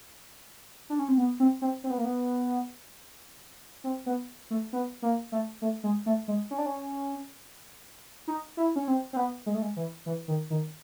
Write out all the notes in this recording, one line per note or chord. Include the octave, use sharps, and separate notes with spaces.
D4
C#4
C4
B3
C4
C4
C4
B3
A#3
B3
C4
B3
A3
B3
A#3
A3
A3
G#3
A3
G#3
C#4
D4
C#4
D#4
E4
C#4
C4
C4
B3
G#3
A3
G#3
E3
E3
D#3
D#3